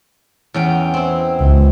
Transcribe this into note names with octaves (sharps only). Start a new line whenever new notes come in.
E2 C#4 G5
C4 E4
C#2